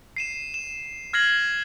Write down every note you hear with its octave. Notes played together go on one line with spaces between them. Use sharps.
C7 D#7 E7
E7
F6 G#6 A#6 C7 F#7